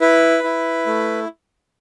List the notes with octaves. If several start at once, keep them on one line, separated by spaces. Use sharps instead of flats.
E4 B4
E4
A3